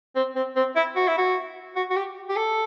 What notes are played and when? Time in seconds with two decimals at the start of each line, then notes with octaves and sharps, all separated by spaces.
0.16 C4
0.36 C4
0.56 C4
0.76 E4
0.96 F#4
1.08 E4
1.18 F#4
1.76 F#4
1.91 F#4
1.96 G4
2.29 G4
2.36 A4